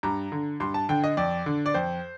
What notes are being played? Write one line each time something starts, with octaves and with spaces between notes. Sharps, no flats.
G2 A#5
D3
G2 C6
A5
D3 G5
D#5
F2 D5
D3
D5
F2 C5